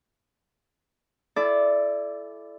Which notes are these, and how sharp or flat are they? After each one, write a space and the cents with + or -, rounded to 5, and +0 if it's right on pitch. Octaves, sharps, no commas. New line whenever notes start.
E4 +20 A4 -20 D5 +0